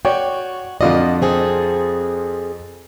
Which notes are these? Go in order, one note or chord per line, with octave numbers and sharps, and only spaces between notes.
F#4 C#5 D5 G5
F2 D4 F4 F#4 D5 D#5
C4 G#4 A4